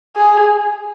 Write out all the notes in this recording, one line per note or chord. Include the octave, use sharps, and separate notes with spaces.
G#4